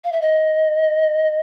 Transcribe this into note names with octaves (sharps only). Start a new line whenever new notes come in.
F5
E5
D#5